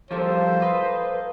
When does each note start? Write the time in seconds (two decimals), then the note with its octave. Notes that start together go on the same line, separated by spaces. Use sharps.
0.11 F3 G3 A#3 A4 C5 E6
0.62 B4 D#5